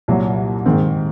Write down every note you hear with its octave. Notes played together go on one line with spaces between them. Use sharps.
C2 A#2 F#3
G#2 D#3 G#3 C4